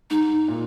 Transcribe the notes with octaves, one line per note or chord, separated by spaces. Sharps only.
G#2 D#4
A#2